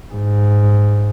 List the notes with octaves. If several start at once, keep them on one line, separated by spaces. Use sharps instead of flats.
G#2